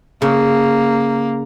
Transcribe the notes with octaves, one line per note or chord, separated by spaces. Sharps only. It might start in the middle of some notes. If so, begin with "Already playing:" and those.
C#3 A#3